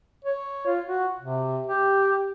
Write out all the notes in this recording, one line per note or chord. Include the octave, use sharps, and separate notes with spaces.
C#5
F4
F#4
C3
G4